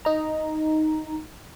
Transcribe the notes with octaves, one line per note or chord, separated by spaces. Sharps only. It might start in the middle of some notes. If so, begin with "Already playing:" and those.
D#4 A#5